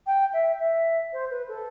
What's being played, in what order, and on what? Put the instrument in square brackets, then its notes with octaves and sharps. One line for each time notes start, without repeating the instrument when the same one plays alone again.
[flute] G5
E5
E5
C5
B4
A4